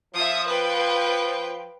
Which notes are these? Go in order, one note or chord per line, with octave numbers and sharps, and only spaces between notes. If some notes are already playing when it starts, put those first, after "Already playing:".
F3 E5 D#6
B4 G5